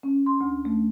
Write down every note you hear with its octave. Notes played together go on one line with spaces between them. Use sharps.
C#4
C6
D2
A3